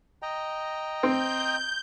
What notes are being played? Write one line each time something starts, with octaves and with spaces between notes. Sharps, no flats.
D#5 G5 A#5
C4 G6